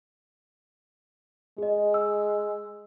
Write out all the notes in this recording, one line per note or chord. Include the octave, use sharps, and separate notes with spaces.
G#3 G#4 D#5
E6